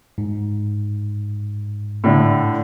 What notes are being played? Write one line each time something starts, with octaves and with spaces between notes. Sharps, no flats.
G#2
A2 D3